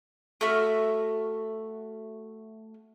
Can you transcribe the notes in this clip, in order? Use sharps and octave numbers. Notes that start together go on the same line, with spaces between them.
A3 F#4 E5 F6